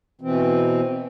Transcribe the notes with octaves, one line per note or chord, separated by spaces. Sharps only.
B2 E3 C4